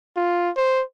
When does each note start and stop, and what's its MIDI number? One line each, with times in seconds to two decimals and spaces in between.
0.16 0.50 65
0.57 0.83 72